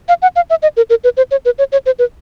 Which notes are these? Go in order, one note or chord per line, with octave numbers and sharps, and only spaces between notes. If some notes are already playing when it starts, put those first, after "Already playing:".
F5
F#5
F5
E5
D#5
A#4
A#4
B4
C5
C#5
B4
C#5
C#5
C5
B4